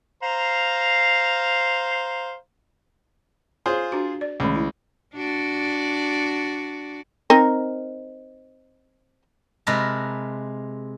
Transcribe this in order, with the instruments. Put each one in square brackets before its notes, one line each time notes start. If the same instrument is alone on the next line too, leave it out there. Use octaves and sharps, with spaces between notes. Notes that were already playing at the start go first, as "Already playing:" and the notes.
[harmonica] C5 F5 A#5
[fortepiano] F4 G#4 C5 [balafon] C#5
[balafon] D4 F#4
D5
[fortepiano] C#2 [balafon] D#3 A3
[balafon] E4
[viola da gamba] D4 F#4 D5
[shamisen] C4 D#4 A#4
[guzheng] C3 G#3 A#4 B4 A5